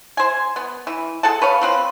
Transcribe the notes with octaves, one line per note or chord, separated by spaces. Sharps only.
C5 G#5
B3
E3
G#4 A4 F#5 A5
B4 C#5 F5
F3 C4 B4